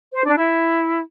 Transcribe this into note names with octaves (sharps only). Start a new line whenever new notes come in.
C5
D4
E4